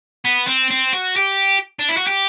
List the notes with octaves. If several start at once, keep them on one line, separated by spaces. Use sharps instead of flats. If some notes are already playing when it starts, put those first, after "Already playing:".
B3
C4
C4
F#4
G4
D4
E4
F#4
G4